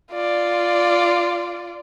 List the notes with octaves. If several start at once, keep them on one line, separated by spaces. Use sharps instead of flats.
F4 D5